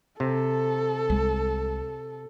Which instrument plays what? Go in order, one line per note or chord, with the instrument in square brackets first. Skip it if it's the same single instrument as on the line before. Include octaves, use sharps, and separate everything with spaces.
[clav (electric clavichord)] C3 [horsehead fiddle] A4
[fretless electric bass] C2 G#3